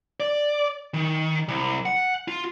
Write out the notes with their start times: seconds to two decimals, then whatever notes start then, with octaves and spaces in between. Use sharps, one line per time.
0.20 D5
0.94 D#3
1.48 C2
1.86 F#5
2.28 F4